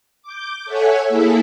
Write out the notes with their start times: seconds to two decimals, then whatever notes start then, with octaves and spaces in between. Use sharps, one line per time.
0.22 D6 G6
0.65 A4 C#5 E5 F#5 G#5
1.09 A#3 E4 G#4 A4 E5